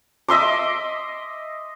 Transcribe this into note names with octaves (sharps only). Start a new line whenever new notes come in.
D#5 E5 C6 D6